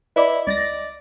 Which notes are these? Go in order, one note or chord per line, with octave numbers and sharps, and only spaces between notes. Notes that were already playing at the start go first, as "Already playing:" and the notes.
E4 B4 D5 D#5 B5
C#2 D5 A6 A#6